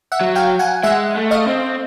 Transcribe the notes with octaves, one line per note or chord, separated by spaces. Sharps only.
E5 F#5
F#3
F5 G5
F#5 G#5
G#3 E5 F#5
A3
D#5 F5
C4